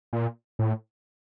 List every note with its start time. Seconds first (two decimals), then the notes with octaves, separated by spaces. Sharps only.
0.13 A#2
0.59 A2